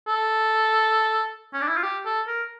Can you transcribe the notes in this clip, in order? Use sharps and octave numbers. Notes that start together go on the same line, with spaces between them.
A4
C#4
D4
E4
F4
G4
A4
A#4